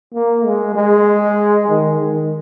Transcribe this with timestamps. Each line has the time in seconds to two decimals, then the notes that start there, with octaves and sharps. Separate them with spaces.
0.14 A#3
0.46 G#3
0.75 G#3
1.69 D#3
1.99 D#3